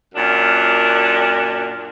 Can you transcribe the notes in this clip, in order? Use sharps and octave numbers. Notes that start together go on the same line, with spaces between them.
F#2 A#2 D4